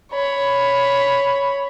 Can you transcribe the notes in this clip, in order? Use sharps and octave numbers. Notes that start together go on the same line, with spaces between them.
C#5 B5